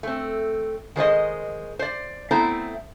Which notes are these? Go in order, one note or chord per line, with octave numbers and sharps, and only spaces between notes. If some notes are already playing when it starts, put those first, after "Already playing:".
A3 C4
D#3 G#3 C5 D#5
C5 D5
A3 B3 C4 E4 C5 A#5